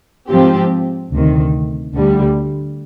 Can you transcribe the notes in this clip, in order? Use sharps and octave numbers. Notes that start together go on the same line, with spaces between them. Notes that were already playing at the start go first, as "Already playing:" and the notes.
G#2 F3 C4 G4
D2 C3 D#3
D2 D3 G3